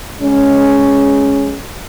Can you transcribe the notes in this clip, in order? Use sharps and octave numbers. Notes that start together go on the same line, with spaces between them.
G#3 C#4